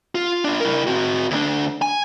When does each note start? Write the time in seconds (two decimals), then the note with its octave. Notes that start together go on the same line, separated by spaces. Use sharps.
0.15 F4
0.44 D4 F4
0.60 E4 A#4
0.87 C4 F#4
1.31 D2 D4
1.82 G#5